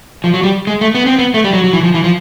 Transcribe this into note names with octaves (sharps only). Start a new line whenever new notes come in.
F3
F#3
G3
G#3
A3
B3
C4
B3
A3
G3
F#3
F#3
E3
F3
E3
F3